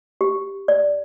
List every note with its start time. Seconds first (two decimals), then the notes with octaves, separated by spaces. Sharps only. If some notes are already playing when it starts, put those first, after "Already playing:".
0.21 G4
0.68 D5